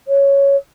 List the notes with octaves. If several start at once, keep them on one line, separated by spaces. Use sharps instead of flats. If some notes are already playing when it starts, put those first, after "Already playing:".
C#5